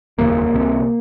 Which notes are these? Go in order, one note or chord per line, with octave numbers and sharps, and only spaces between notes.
F1 D#2 C#3 A#3
C#2 C3